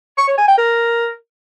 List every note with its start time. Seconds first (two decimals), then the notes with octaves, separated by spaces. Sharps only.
0.18 C#6
0.28 C#5
0.38 G#5
0.48 G5
0.58 A#4